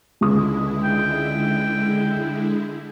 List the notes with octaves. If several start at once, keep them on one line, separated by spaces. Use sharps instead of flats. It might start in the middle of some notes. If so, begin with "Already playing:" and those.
C#2 D3 G#3 E4 D#6
G5